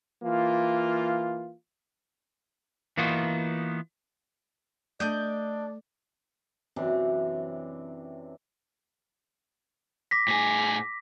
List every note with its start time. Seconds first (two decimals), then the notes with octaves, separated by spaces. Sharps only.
0.23 E3 A#3 F4
2.97 E3 A#3 B3 D#4 F4 F#4
5.00 A3 D4 D5 D#5 G6
6.76 F#2 C3 E3 D4
10.11 D6 A#6 B6
10.28 A2 G#4